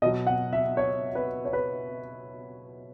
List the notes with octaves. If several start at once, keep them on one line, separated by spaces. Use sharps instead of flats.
B2 F#3 D#5
F#5
E5
C#5
B4
C#5
B4